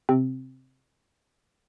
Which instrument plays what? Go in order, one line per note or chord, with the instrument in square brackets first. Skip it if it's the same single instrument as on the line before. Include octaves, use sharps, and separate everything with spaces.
[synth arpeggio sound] C3 C4